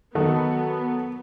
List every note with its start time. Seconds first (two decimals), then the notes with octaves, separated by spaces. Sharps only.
0.15 D#3 F#3 B3 F#4 A4